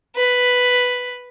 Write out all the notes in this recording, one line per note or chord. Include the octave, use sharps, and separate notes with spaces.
B4